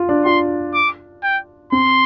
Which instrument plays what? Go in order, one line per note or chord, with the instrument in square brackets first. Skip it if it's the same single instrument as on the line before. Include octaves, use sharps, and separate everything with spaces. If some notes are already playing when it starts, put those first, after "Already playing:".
Already playing: [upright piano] F4
D4
[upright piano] F4 [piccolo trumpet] C6
[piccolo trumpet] D6
G5
[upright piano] C4 [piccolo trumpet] C6